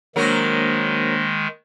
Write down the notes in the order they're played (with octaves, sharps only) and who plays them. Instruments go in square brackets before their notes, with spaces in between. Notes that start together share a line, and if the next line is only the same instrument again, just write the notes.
[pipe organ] D#3 G#3 [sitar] F#3 A#4 [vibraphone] A#3 D4 C5